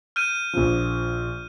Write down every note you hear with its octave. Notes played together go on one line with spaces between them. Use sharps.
F6 G6 D#7
A#1 F3